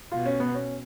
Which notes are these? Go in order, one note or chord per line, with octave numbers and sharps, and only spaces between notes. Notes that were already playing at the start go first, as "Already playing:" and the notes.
B2 F4
C#4
B3
C#4